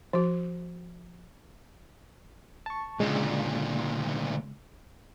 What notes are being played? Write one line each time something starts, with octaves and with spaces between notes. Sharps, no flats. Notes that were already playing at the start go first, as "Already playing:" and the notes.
F3 F#4
A5 C#6
D2 A#2 C#3 G#3